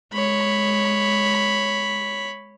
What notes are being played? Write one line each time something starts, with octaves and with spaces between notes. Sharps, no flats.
G#3 C#5 B5